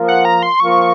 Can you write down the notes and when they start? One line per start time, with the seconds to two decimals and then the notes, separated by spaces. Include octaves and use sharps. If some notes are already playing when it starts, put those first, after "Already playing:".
Already playing: F3 A#3 F4 A#4
0.08 F#5
0.25 A#5
0.43 C6
0.59 F3 A#3 F4 A#4 C#6